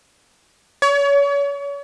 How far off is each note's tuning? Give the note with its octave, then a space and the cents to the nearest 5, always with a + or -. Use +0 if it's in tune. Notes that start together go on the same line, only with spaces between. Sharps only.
C#5 +35